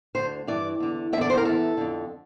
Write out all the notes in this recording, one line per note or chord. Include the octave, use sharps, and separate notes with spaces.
D2 D3 C5
G2 E3 D5
E2 D3
E2 D3 D5 E5
C5
A#4
E2 E3 A4
F2 D3